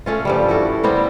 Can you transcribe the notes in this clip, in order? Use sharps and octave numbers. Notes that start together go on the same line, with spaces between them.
A3 C#4 F4
G2 F3 G3
E4 F#4 A4
G3 B3 C4